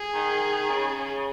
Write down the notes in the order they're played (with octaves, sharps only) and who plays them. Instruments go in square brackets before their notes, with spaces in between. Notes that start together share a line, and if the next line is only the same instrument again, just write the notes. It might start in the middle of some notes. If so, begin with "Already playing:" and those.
Already playing: [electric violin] G#4
[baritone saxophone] D#3
C#3